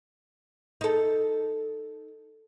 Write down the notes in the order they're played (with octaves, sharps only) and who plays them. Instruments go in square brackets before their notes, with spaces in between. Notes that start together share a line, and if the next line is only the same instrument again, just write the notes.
[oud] D#4 A4